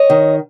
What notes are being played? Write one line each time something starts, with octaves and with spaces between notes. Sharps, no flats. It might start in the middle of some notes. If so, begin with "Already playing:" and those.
Already playing: C#5 D#5
D#3